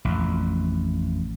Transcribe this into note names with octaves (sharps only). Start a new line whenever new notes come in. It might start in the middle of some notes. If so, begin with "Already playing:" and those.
A1 F2